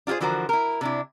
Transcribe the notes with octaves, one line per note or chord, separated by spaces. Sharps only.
D4 F4 G4 G#4 C5
D3 E3 F3 F#4 A#4 C5
E4 A#4
C3 D4 E4